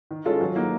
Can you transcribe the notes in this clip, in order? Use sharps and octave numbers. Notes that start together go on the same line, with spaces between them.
D#3
G#3 C#4 F4 A4
F#3
A#3 D#4 F#4